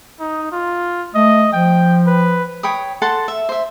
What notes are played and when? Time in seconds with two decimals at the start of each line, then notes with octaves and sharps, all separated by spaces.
0.20 D#4
0.52 F4
1.15 A3 D#5
1.53 F3 G5
2.07 B4
2.63 C#5 G5 B5 D#6
3.02 A4 F#5 A5 C6
3.28 E5
3.49 C5 E5